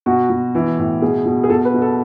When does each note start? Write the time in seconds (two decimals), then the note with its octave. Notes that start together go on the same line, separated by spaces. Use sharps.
0.06 B2 F#4
0.30 B2
0.55 E3
0.78 A2
1.02 B2 G#4
1.26 B2
1.44 G#4
1.50 B2 A4
1.65 B4
1.74 B2
1.82 A4